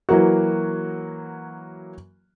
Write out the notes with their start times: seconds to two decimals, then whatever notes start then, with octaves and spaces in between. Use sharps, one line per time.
0.09 E3 F#3 A#3 F#4